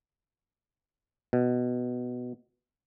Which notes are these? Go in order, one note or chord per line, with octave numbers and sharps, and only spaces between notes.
B2